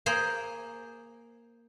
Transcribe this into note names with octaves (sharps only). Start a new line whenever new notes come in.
A#3 G#4 C5